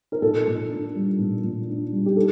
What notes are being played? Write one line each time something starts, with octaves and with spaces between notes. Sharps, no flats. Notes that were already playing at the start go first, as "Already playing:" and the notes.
A#4
A#2 A4
A#2
D4
G3
A#2
A#2
D4
G3
G4
A4